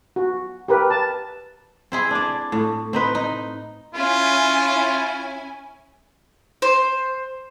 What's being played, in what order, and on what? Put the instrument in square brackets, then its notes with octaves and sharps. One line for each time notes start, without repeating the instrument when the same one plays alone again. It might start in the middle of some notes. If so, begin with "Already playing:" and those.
[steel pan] F#4
G4 A#4 B4
A5
[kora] C4 E4 G#4
D4 D5
A2
C4 D#4 B4
D#4
[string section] C#4 E4 G#5 [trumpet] F4
[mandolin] C5